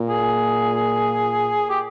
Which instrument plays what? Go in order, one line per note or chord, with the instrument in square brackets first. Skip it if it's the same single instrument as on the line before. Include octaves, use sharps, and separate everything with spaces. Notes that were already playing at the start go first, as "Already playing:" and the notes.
Already playing: [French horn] A#2
[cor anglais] G#4
G4